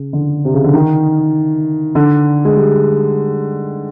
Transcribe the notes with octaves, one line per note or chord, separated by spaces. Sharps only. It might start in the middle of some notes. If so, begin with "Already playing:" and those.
Already playing: C#3
D3
C3
C#3
D3
D#3
D3
G#3
G3